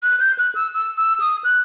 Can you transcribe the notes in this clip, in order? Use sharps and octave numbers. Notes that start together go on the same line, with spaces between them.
F#6
G6
F#6
E6
E6
E6
D#6
F#6